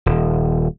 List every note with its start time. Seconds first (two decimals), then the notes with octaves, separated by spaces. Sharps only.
0.06 D#1